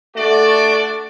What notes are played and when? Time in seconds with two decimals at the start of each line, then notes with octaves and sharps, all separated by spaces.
0.15 A3 D4 F#4 D5